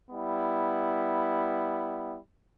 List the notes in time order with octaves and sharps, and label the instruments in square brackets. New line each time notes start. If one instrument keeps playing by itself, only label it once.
[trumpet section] G3 B3 E4